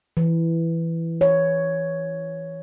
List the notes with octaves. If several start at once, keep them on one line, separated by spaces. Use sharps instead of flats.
E3
C#5